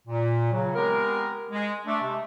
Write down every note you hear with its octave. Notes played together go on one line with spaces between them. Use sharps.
A#2
C#3 F#3
G#3 B3 C4 G4 A#4
G#3
A3 D4
C3 G#3 A3